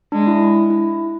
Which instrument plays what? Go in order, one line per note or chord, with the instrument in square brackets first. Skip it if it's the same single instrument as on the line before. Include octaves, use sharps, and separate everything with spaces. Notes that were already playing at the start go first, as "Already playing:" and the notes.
[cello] G#3 [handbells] D4
[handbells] E4
E4